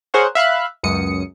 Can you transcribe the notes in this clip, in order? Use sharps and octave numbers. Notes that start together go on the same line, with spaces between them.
G#4 A#4 C5 C#5 F#5 C#6
E5 F5 B5 F#6
C#2 F#2 D#6 C#7